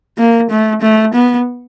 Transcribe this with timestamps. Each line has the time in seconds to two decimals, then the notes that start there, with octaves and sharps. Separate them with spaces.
0.18 A#3
0.50 A3
0.82 A3
1.14 B3